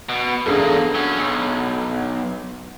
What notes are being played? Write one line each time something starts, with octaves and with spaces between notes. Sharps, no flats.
B2
E2 A#3 D4 G#4 A4
F#3 C#4
B1